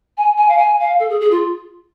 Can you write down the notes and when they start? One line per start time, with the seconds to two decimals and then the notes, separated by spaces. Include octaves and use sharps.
0.18 G#5
0.38 G#5
0.48 F5
0.58 G#5
0.80 F5
1.00 A4
1.10 G#4
1.21 G#4
1.31 F4